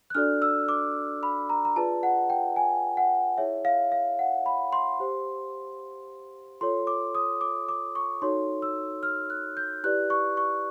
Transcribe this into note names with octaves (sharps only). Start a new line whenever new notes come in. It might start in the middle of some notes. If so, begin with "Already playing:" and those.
F#6
D4 F#4 A4 D5 F6
E6
D6
B5
A#5
A#5
F4 G#4 B4 D5 A5
F#5
G5
G#5
F#5
E4 G#4 C#5 E5
F5
F5
F#5
B5
C6
G4 C5
F4 A4 C#5 C6
D6
D#6
D6
D6
C#6
D#4 F#4 A4 C#5 C6
E6
F6
F#6
G6
E4 G4 B4 D5 F#6
C#6
C#6